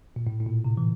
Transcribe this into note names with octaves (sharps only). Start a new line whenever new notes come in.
A#2
A2
A2
A#2
C3
E3